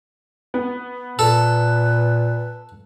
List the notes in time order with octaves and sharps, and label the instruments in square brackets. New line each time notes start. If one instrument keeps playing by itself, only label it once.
[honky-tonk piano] B3
[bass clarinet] A#2 [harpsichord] A4 [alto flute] B4